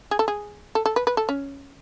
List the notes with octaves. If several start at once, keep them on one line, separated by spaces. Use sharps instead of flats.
G#4
A4
G#4
A4
A4
B4
B4
A4
C#4